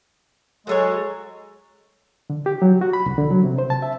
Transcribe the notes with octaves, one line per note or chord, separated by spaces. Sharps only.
F#3 G#3 F#4 G#4 A4 C#5
D3
G4
F#3
F#4
B5
C2
D3
F#3
C3
C5
A5
E5